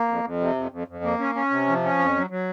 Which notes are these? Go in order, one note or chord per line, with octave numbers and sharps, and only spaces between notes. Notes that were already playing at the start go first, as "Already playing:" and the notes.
Already playing: A#3
F2
F2
C3
F2
F2
F2
A#3
C#4
C#4
C3
F3
C#4
F2
F#3
F#3